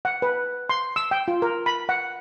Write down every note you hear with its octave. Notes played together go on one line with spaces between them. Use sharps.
F#5
B4
C6
E6
G5
F4
A#4
B5
F#5